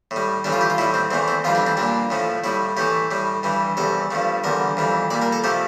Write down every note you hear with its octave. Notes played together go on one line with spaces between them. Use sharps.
A2
G3
A2 E3 G3 D4
F4
G4
F4
A2 G3 E4
C4
E2 E3 A3 C4
C4
F2 E3 G3 F4
D4
C4
A#2 G3 D4
A2 F3 A3
A2 G3 E4
A2 E3 A3 G4
A2 G3
G2 E3 G3
E2 C3 G3 A4
G2 F3 A3
E2 D3 G3 A#4
F2 E3 G3
A#2 G3 D5
A#4
A4
C3 F3 A3 G4